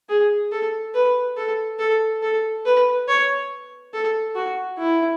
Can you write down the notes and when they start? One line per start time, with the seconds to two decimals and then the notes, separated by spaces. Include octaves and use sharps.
0.09 G#4
0.52 A4
0.94 B4
1.37 A4
1.79 A4
2.22 A4
2.65 B4
3.08 C#5
3.93 A4
4.35 F#4
4.78 E4